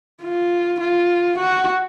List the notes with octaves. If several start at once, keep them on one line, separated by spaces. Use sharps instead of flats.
F4
F4
F#4